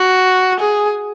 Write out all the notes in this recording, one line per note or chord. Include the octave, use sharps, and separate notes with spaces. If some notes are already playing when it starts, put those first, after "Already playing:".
Already playing: F#4
G#4